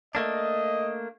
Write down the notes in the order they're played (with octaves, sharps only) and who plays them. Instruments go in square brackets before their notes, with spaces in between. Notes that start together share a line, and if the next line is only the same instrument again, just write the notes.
[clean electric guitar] A3 A#3 D4 [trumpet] D#5